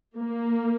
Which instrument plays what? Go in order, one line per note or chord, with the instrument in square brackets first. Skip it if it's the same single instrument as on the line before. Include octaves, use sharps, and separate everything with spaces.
[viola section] A#3